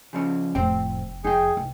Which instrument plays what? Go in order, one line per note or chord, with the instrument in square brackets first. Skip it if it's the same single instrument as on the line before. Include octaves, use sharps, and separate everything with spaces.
[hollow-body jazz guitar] C#3 F3 C#4
[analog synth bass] F1 [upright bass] F2 A2 [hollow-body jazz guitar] C4 G5
[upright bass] F2 [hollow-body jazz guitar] D#4 G5 [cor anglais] G#4
[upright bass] C2